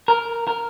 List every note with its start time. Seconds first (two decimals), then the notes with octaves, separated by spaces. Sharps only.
0.08 A#4
0.47 A#4